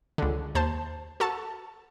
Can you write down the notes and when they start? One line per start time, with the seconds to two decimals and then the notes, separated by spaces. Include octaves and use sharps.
0.18 C#2 D3
0.55 D#2 C5 A5
1.20 F#4 A4 A5